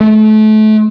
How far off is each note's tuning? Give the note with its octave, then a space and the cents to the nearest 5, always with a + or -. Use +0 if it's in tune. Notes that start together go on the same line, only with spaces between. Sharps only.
A3 -30